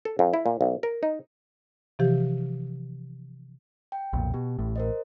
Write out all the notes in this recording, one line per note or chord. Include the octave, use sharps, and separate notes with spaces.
A4
F2
E4
A#2
B1
A#4
D#4
C3 E3 F3 G4
G5
B1 F2 A#2
B2 G4
A1 A2
A#4 C5 D#5